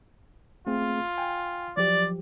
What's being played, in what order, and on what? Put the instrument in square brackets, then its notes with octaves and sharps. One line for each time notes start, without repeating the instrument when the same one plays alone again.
[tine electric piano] A3 C4 G#4 [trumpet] F4
[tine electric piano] G5 G#5
[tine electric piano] F3 F#3 G4 [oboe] D5